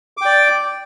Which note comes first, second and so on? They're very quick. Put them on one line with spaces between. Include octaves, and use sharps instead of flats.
D6 G5 D5